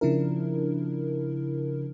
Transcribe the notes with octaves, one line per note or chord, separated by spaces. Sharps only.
C#3 F3 D4 E4 A#4